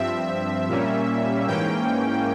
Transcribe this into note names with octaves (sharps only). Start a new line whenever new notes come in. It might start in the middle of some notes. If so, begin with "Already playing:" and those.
Already playing: G2 F3 C4 E5
A#2 G3 A#3 C#4
G#2 E3 A#3 C#4 G5